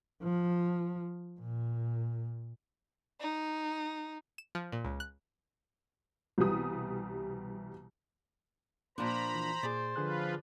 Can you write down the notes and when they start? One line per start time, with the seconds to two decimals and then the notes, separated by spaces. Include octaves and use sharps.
0.23 F3
1.40 A#2
3.21 D#4
4.38 E7
4.55 F3
4.72 A#2
4.85 C#2
5.00 F#6
6.38 C2 B2 E3 G3 D#6
8.98 A#2 F3 D4 C5 A#5 B5
9.35 E3
9.63 A#2 G#4 D5
9.96 D3 F3 F4 G#4 B4 F#6